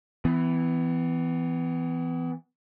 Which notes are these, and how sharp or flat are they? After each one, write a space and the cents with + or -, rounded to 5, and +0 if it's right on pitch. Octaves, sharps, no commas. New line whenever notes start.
E3 +0 B3 +35